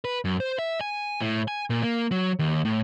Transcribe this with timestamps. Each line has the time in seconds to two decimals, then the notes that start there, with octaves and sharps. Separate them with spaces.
0.05 B4
0.25 F#2
0.40 C5
0.59 E5
0.81 G#5
1.21 A2
1.48 G#5
1.70 A#2
1.83 A#3
2.12 F#3
2.39 D#2
2.65 A2